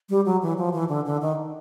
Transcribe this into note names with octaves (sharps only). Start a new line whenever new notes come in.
G3
F#3
E3
F3
E3
D3
D3
D#3